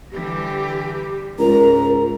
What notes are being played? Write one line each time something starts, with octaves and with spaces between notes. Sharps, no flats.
D3 E3 G3 G4
C#2 G#2 A#4 A#5